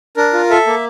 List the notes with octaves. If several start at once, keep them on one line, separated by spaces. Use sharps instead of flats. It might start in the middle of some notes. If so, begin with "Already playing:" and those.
D4 A#4
F4
A4 E5
A#3